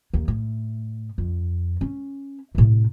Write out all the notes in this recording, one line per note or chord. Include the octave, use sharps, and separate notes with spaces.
D#2
A2
F2
C#4
A2 C3